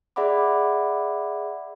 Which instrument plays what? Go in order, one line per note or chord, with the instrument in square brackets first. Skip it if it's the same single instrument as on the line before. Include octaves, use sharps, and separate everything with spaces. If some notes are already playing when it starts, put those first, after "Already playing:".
[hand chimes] G#4 D5 E5 F#5 B5 D6